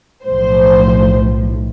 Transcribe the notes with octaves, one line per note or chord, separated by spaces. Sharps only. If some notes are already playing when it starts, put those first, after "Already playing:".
B1 A2 F3 C5